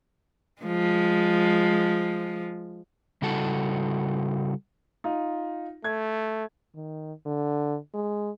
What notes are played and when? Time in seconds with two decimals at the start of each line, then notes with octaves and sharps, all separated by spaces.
0.62 F3 G#3
3.22 C#3 G3 E4 F#4 A4 A5
5.04 D#4 F4
5.84 A3 G#6
6.75 D#3
7.26 D3
7.94 G#3